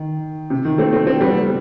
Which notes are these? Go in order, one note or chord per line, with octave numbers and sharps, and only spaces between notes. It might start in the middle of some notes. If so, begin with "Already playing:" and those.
Already playing: D#3
C3
D#3
A3 C4
A3 C4
A3 C4
G3 B3